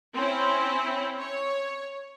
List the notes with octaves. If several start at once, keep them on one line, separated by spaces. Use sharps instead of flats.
C4 C#4 E4
C#5